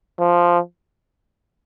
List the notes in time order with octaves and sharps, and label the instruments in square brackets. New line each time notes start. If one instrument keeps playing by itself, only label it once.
[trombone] F3